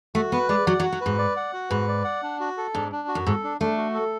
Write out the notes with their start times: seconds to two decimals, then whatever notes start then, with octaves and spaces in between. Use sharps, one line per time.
0.15 A3 F#4
0.32 B3 B4
0.49 G#3 D5
0.66 F#3 F#5
0.80 F#3
0.83 F#4
0.92 F#3
1.01 B4
1.06 G#2
1.18 D5
1.37 F#5
1.53 F#4
1.70 G#2 B4
1.88 D5
2.04 F#5
2.23 D4
2.40 F#4
2.57 A4
2.74 G#2 D4
2.92 D4
3.08 F#4
3.15 F#2
3.26 G#2 A4
3.44 D4
3.61 A3 D4
3.77 F#4
3.94 A4